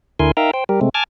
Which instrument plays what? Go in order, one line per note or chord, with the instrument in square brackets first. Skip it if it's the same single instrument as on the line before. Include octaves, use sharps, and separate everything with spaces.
[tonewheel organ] D2 D3 E4 A#4 G#5 C6
D#4 A#4 E5 F5 G5 A#5
C5 G5
G3 G4 A#4
C3 G#3 A3 C4
G#5 A5 D6 F6 G#6